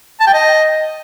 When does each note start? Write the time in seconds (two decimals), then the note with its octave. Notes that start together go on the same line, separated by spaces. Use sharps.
0.20 A5
0.27 G5
0.34 D#5